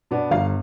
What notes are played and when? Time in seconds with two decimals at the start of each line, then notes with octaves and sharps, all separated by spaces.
0.11 B2 B3 D4
0.31 G1 F5